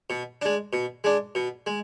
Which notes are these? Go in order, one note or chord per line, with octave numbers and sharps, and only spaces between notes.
B2
G#3 D4
B2
G#3 D4
B2
G#3